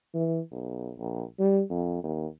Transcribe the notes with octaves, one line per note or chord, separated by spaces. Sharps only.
E3
B1
A#1
G3
F2
D#2